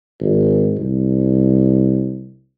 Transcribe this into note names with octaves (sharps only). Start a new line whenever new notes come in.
G#1
C2